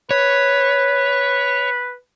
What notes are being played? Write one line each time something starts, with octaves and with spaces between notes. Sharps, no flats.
B4 C#5